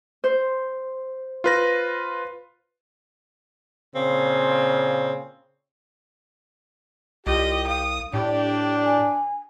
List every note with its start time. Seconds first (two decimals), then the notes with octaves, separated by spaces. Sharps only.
0.24 C5
1.44 F4 B4 A#6
3.94 A#2 C#3 C4
7.27 C2 F4 G4 D#5
7.67 F5 D#6
8.13 A2 D4 G4 G5
8.84 G#5